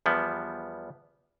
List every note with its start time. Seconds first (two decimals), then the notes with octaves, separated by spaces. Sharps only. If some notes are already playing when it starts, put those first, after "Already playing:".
0.06 E2 F3 G3 B3